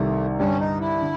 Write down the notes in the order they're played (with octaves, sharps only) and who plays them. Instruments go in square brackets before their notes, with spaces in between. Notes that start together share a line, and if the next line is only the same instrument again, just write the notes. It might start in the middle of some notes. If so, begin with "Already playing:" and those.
Already playing: [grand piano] C2 C3 D#3 [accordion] A3
[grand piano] G2 D3 G3 [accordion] C#4
[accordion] D#4
E4
[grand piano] D3